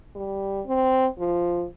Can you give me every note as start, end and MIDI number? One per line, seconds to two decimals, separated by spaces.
0.16 0.61 55
0.67 1.06 60
1.18 1.65 53